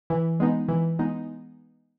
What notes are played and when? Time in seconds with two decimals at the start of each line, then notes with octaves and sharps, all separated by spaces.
0.10 E3
0.40 G#3 B3 D#4
0.68 E3
0.99 G#3 B3 D#4